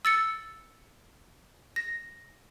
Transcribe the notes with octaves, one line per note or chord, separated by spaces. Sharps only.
E6 A6 C#7
A#6